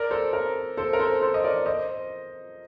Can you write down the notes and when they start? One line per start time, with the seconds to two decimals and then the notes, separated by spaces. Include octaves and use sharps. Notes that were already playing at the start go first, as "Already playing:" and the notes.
Already playing: A#4 D5
0.10 A4 C5
0.33 A#4
0.77 A4 C5
0.93 A#4
0.99 A4 C5
1.21 A4 C5
1.34 D#5
1.44 A#4 D5
1.66 C5 D#5